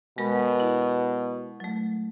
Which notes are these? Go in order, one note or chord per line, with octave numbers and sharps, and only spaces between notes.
B2 G#3 A#4 B5
E4
F#3 A3